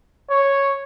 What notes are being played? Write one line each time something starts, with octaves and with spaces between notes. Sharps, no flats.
C#5